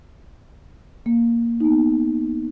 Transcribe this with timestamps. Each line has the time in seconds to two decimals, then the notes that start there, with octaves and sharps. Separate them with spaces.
1.06 A#3
1.60 B3 D#4